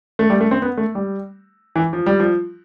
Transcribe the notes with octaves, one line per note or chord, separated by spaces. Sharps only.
A3
G3
A3
C4
B3
A3
G3
E3
F3
G3
F3